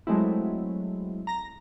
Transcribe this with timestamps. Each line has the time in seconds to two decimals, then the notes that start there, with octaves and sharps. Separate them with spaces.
0.07 F#3 G#3 A3 C4 E4
1.27 A#5 A#6